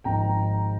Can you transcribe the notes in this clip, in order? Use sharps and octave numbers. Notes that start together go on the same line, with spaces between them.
G#1 G#2 F3 G5 A#5